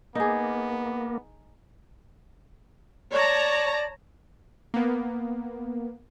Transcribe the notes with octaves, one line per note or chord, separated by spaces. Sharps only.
A#3 B3 D#4 G#4
C#5 D5 A5 A#5
A#3 B3